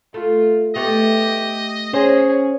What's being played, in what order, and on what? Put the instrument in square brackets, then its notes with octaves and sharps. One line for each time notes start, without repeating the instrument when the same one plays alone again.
[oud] A3 [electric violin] F4
[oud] A3 B3 [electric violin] G4 [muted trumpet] D#5
[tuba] C#4 [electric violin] G#4 [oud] C5